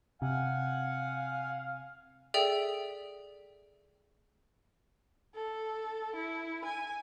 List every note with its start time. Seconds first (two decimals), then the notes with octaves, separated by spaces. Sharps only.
0.22 C3 F5 F#5 G#5
2.34 G#4 A4 D5 E5 G5 F7
5.35 A4
6.15 E4
6.65 G#5